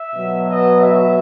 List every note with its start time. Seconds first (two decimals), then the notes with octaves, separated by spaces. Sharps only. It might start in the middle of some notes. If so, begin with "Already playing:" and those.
Already playing: E5
0.15 B2 F#3 B3
0.47 D#5
0.79 E5